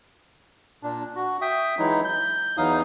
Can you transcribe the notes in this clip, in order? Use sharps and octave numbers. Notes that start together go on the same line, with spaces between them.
A#2 D4
F#4
E5 G5 D#6
E3 F#3 G#3 D#4 E4
G6
E2 E3 F#3 D#4 F5 D#6